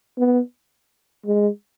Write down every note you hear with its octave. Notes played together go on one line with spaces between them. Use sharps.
B3
G#3